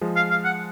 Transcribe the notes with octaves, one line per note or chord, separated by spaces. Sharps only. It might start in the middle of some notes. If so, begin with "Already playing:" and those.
F3 G#3
F5
F5
F#5